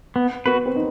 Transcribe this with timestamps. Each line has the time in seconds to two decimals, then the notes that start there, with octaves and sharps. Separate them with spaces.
0.16 B3
0.46 B3 F#4 B4
0.66 C4
0.76 D#4